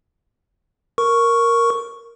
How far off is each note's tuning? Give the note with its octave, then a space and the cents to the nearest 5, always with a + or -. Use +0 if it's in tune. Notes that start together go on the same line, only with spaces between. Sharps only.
A#4 +0 C#6 +0